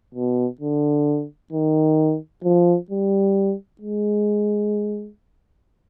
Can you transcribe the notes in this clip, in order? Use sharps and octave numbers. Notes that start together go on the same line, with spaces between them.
B2
D3
D#3
F3
G3
G#3